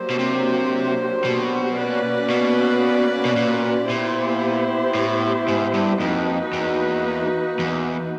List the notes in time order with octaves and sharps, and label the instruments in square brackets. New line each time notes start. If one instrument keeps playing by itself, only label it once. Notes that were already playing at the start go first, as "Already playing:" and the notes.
Already playing: [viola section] F#3 A#3 D4 G4 C5
[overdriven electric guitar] B2
C3
B2
[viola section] A#3 C#4 F#4 B4 D5
[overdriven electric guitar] B2
B2
A#2
[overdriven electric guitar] A#2 [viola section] B3 E4 G4 C5
[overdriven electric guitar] A2
G#2
G2
[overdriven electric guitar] F2 [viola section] A#3 D#4 F#4 B4
[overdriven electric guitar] E2
E2